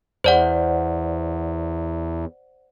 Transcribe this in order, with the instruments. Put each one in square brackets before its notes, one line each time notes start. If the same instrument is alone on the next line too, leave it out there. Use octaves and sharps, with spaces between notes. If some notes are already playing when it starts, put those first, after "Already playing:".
[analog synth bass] E2 [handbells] C5 D5 F#5